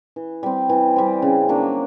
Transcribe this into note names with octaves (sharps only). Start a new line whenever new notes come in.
E3
G3 C4
E3
G3 C4
C#3
F#3 A#3 D4